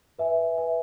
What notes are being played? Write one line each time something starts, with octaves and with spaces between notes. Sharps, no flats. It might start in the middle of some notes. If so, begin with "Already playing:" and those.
B4 E5 G#5
B4 E5 G#5